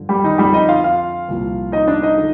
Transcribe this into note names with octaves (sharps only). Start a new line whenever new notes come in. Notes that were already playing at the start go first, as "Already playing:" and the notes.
Already playing: G2 D3 F3
G3 G4
D#3 D#4
F2 D3 F3 G3 G4
D#4 D#5
F4 F5
F4 F5
C2 A#2 F3
D#4 D#5
D4 D5
D#4 D#5
D3 F3